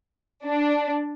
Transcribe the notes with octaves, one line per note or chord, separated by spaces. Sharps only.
D4